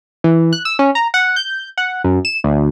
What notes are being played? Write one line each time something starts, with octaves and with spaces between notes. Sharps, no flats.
E3
F#6
E6
C#4
A#5
F#5
G6
F#5
F#2
E7
D2